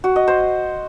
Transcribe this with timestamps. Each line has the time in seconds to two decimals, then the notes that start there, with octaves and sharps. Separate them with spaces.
0.04 F#4
0.16 D#5
0.28 C5